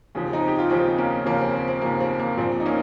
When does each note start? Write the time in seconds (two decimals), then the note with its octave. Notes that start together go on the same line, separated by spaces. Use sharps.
0.15 D#2 C#3 F3
0.33 C4 D#4
0.48 G4
0.59 F4
0.70 D#2 C#3 F3 C4 D#4
0.98 A#3 C#4
1.26 D#2 C#3 F3 A#3 C#4
1.40 C4
1.54 C4
1.68 C4
1.81 D#2 C#3 F3 A#3
2.00 C4
2.20 A#3
2.37 A#1 A#2 F3 C4
2.60 D#4
2.66 A#3 C#4